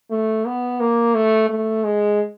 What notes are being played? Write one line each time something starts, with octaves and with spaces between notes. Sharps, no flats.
A3
B3
A#3
A3
A3
G#3